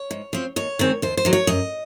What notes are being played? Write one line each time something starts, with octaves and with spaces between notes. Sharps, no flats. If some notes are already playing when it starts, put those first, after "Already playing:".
Already playing: C#5
G#2
F3 C4
D#2 C#5
D#3 G#3 C4
D#2 C5
C5
D#3 F#3
C#5
F#2 D#5